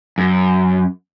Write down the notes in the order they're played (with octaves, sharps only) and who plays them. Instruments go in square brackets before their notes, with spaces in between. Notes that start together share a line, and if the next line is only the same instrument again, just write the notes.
[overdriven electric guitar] F#2